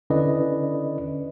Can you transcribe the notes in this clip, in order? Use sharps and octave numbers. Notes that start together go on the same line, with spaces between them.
D3 C#4 E4 B4 D5 D#5